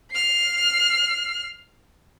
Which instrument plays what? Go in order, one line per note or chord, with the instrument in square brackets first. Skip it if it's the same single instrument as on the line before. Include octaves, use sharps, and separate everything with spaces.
[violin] F6 C7